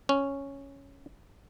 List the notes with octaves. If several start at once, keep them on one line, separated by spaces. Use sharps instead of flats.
C#4